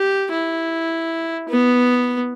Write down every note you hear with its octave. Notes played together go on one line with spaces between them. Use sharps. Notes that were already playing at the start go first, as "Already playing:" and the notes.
Already playing: G4
E4
B3